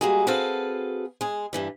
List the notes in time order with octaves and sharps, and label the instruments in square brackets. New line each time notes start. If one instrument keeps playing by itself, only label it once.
[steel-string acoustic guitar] G3 G#3 A#3 F#4 G#4
C4 F#4 G#4 A4 B4 F5
G#3 G#4
G2 E3 G3